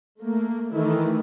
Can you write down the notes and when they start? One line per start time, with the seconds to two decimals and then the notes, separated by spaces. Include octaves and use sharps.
0.20 A3 A#3
0.74 D#3 E3 A3 E4